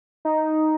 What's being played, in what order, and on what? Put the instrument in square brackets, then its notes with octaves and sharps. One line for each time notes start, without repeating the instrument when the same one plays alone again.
[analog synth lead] D#4